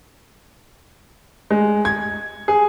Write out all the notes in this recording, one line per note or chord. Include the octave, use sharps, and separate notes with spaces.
G#3
G#6
G#4